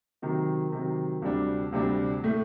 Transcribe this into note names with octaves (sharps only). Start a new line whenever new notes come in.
C3 D#3 F#3
C3 D#3 F#3
D2 C3 G3 D4
D2 C3 G3 D4
A2 A3